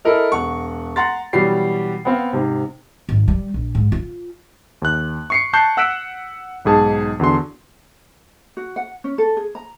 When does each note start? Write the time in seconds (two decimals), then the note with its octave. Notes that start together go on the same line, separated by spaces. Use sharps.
0.05 E4 A4 A#4 D#5
0.32 E1 F#5 C#6
0.96 F#5 A#5 C6 A6
1.33 B2 E3 F#3 G3 G4 C7
2.05 B3 C4 F5
2.33 G#2 C3
3.09 G#1
3.28 G3
3.54 A#1
3.75 G#2
3.92 F4
4.82 D#2 F#6
5.30 C#6 C7 C#7
5.53 A5 C#6 F#6 G6 C7
5.77 F#5 E6 F#6 B6 D7 E7
6.65 B1 G#2 G#4 A5
7.19 E2 D3 F#4 C6
8.57 F#4
8.76 F#5
9.04 C#4
9.18 A4
9.37 G#4
9.55 A#5